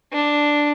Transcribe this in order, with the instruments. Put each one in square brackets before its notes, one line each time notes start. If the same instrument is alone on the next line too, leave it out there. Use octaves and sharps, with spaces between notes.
[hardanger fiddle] D4